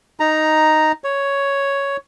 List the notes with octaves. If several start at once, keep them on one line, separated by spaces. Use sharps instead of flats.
D#4 A#5
C#5